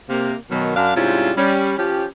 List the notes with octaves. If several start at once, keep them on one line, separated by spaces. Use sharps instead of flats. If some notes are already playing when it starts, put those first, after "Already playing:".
C3 A#3
B2 D#3 F#3
F#2 D4 F5
G#2 C3 G3 C#4 E4 F4
G3 C#4
F3 C#4 G4